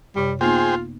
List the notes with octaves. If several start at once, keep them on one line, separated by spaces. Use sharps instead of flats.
F#2 C3 G3 C#5
A#3 B3 D#4 F4 G#4 C5 G5